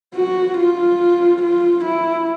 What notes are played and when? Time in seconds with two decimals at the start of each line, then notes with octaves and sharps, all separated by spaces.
0.15 F#4
0.57 F4
1.42 F4
1.84 E4